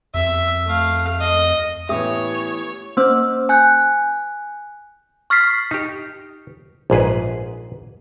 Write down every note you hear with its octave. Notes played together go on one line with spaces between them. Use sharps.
F2 E5
A3 F5
D#5
A2 E3 B3 C#4 G4 C#5 E5 D#6
A#3 C#4 C5 E6
G#5 F#6 G6
C#6 F6 A6 B6 C7
D#4 G4
A#1 G#2 G#4 B4